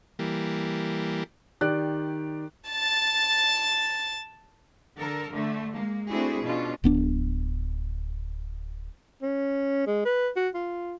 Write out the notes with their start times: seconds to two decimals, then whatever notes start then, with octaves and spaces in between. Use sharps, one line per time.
0.19 E3 G3 A#3
1.61 D#3 G4 D5 F#6
2.70 A5 A6
4.97 D3 A4 A#4
5.30 D3 A3
5.73 G#3 A#3
6.07 A3 C4 D4 E4 F#4 G#4
6.42 B2 C#4 D4 F4
6.84 D1 B3 D4
9.22 C#4
9.87 G#3
10.05 B4
10.36 F#4
10.54 F4